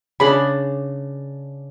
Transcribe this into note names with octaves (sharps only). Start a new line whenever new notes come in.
C#3 D4 G#4 B5